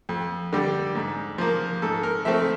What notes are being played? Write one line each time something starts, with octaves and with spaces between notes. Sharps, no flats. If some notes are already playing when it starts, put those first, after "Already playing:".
F2
D3 G3
G#2
F3 A#3
G#2 A4
A#4
F3 A3 C4 E5